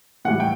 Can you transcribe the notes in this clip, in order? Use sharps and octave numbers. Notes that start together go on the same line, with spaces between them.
A2 E3 G3 F#5
G5